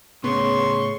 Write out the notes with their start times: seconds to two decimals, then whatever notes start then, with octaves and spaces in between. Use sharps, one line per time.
0.24 A2 C#3 B3 C6 C#6